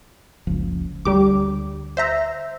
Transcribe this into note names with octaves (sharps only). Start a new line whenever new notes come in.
F#1 C#2 F3
D2 G3 G4 D6
C5 E5 A#5